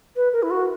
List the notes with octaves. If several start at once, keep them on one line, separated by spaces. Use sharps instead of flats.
B4
A#4
E4
F#4